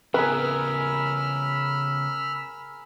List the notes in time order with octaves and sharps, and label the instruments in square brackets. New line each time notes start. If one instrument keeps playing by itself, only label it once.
[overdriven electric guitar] C#3 B3 [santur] G#4 A#4 [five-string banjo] B4 [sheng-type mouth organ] B5 E6 F6